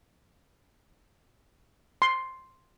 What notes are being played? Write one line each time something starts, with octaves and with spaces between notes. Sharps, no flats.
C6